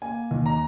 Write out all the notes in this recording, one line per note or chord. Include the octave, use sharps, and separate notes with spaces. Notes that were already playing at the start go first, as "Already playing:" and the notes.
A#3 G#5
D#2
A#5